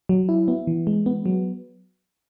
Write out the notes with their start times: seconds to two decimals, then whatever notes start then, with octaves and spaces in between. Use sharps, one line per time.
0.09 F#3
0.29 E4
0.48 B3
0.67 E3
0.87 G#3
1.06 B3
1.26 F#3